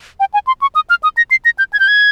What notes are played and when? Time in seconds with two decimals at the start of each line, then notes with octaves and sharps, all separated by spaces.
0.20 G5
0.34 G#5
0.47 C6
0.62 C#6
0.75 D#6
0.90 F6
1.03 D#6
1.17 A#6
1.31 C7
1.45 A#6
1.59 G6
1.73 G#6
1.80 G6
1.88 G#6